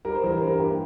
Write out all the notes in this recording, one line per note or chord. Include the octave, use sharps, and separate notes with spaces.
G3 A#4
C5
E3 A#4
G2 C5
A#4
A#3 G4